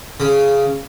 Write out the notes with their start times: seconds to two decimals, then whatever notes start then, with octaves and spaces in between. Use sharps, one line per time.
0.20 C#3